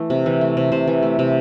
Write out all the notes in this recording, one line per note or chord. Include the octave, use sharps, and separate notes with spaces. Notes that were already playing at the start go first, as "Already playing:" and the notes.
Already playing: E3 A3
C3
E3
A3
C3
C3 C5
E3
A3
C3